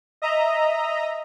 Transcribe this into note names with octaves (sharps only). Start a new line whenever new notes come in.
D#5 E5 A#5